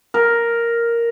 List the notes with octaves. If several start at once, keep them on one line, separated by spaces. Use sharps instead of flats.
A#4